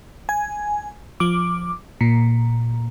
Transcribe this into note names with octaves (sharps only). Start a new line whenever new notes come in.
G#5
F3 D6
A#2